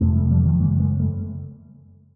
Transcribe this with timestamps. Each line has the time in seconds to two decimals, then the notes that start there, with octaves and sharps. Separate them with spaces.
0.01 F2 C3 A3 B3
0.16 G3 A3
0.31 F3 G3
0.45 D#3 F3
0.60 F#2 C#3 G#3 A#3
0.80 G#3 A#3
0.99 G3 A3